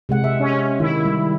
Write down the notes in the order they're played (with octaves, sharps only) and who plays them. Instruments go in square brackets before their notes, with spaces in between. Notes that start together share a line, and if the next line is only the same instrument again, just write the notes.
[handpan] C3 G#3 F#5
E5
[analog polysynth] C#4
[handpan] D#3 [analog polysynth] E4
[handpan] G3